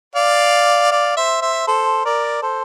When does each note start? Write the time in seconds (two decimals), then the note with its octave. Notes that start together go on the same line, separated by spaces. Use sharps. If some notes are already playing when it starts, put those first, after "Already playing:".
0.15 D5 F5
0.91 D5 F5
1.17 C5 E5
1.42 C5 E5
1.67 A4 C5
2.05 A#4 D5
2.43 A4 C5